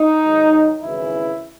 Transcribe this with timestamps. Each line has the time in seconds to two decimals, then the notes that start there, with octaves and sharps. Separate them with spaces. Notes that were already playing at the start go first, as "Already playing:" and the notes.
Already playing: D#4
0.21 G#2 D#3 F#3
0.83 G#1 F#2 C#3 E3 E4